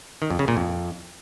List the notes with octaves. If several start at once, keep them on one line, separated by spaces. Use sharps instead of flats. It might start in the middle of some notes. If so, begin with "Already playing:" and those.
D#3
F2
C#3
A#2
F2